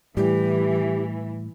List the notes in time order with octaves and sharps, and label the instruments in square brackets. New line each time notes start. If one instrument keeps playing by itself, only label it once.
[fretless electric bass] A2 G3 [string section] E3 [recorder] G4